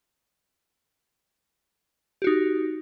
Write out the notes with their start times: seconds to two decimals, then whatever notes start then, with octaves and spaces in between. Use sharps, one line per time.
2.22 G4
2.24 F#4
2.27 D#4